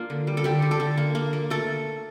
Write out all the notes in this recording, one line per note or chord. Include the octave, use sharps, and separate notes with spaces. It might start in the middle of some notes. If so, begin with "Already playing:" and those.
Already playing: A#3 D4 F4
D3
G3
A4
D3 G4
D3
A4
D3
A#3
A#3
A#3
A3 A4